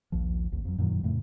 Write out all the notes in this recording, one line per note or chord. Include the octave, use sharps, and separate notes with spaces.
A#1 D#2 F3
G#1 D2
F2 F#3
F#2 A#2 D#3 F#3
F2 A2 C#3 A3